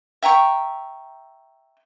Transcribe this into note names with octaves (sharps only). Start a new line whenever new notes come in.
E5 G5 A#5 C#6